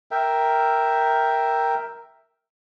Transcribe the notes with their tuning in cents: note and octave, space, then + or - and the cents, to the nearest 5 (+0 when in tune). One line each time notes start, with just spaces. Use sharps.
A#4 +0 E5 +0 G5 +0